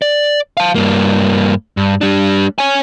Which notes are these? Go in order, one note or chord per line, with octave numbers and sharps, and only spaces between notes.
D5
F5 A5
G2 A#3
G2
G3 D4
C#5 G#5